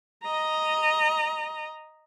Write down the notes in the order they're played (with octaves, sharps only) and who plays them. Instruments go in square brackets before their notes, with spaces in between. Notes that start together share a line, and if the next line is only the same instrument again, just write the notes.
[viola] D#5 A#5